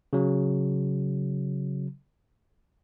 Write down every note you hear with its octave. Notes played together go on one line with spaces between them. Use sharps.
C#3 F#3